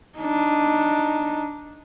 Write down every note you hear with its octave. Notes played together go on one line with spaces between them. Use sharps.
D4 D#4